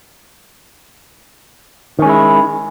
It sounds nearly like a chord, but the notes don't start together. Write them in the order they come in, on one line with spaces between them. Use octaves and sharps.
D#3 C#4 G#3 E4